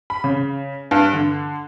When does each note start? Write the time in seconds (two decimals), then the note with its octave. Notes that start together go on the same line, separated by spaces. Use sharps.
0.10 B5
0.24 C#3
0.91 G2
1.13 D3